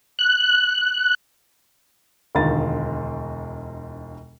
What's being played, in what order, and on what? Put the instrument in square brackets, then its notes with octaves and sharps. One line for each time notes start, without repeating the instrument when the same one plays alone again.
[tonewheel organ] F#6
[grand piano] E1 D2 D#3 F4 A#5 A6